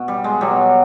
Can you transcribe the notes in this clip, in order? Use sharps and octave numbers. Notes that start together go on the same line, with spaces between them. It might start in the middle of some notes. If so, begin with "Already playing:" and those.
Already playing: B2
G3
G#3
B2 F#3 G3